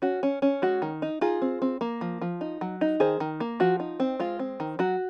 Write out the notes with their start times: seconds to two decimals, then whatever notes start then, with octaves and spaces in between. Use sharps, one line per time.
0.02 C#4 F#4
0.23 C#4
0.42 C#4
0.62 G#3 F#4
0.82 D#3
1.02 D#4
1.21 D#4 F4 G#4
1.42 C4
1.62 C4
1.81 A#3
2.01 F3
2.22 F3
2.41 D#4
2.61 F#3
2.81 D#4
3.00 D#3 G#4 C5
3.20 D#3
3.40 A#3
3.60 F3 F#4
3.80 D#4
4.00 C4
4.20 G#3 F4
4.39 C4
4.60 D#3
4.79 F#3 F#4